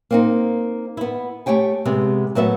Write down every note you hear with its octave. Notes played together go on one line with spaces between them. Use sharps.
A#3 C4 D#4
B3 E4
A3 G4 C#5 G5 G#5
C3 G#3 B3 G4
F#3 A3 B3 E5